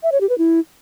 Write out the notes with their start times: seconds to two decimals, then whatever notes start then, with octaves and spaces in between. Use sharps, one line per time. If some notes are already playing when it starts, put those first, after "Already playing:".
0.03 E5
0.12 C#5
0.21 G4
0.29 B4
0.38 E4